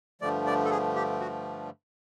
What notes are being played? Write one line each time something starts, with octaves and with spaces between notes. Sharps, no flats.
G2 D3 F3 A3 D5
D5
A4
G#4
G4
F#4